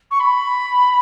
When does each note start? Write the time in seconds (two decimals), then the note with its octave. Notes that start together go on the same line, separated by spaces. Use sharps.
0.11 C#6
0.19 B5